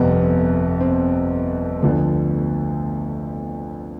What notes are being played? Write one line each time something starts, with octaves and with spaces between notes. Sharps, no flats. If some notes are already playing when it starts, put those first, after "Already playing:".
Already playing: G1 F2 C3 B3
C4
D2 D3 F3 B3